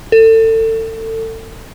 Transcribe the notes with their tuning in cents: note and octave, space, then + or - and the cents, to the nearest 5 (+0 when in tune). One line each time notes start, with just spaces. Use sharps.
A4 +30